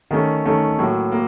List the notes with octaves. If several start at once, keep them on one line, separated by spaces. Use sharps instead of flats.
D#3 A3 C#4
D#3 A3 C#4
A2 F#3 A#3
A#3